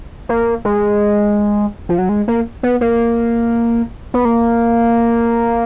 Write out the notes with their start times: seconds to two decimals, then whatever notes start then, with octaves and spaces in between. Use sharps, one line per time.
0.29 A#3
0.65 G#3
1.89 F3
1.98 F#3
2.09 G#3
2.28 A#3
2.63 B3
2.81 A#3
4.14 B3
4.25 A#3